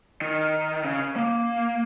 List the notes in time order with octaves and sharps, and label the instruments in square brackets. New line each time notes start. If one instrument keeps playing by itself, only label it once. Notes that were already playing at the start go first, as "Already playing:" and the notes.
[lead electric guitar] D#3
C#3
A#3